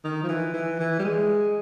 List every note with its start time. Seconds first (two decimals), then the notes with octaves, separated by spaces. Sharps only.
0.04 D#3
0.23 F3
0.28 E3
0.53 E3
0.79 E3
0.99 G3
1.04 G#3